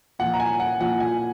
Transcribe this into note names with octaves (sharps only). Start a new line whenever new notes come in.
A#2 F3 F#5
A#5
G#5
F#5
A#2 F3 F#5
G#5